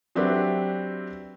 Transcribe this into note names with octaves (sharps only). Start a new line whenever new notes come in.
F#3 C4 D4 G4 B4 E5